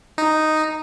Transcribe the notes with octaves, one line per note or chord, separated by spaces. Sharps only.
D#4